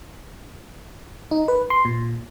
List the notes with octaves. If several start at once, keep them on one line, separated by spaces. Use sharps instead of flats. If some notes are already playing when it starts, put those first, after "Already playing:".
D#4
B4
C6
A#2